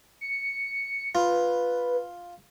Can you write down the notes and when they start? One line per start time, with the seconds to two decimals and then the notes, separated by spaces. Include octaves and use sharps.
0.21 C#7
1.15 F4 B4